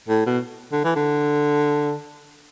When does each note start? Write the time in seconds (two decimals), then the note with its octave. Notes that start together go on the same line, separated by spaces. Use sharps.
0.09 A2
0.26 B2
0.72 D3
0.84 E3
0.96 D3